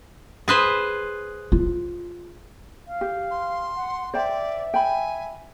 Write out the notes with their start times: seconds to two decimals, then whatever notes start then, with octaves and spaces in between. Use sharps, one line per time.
0.48 G#4 B4 C5
1.52 F4
2.87 F5
3.01 G4
3.31 C6
3.76 F#5
4.14 C5 D5 E5 G5 A5
4.74 G5 G#5 B5